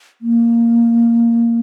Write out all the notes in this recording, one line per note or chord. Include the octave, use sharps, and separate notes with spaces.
A#3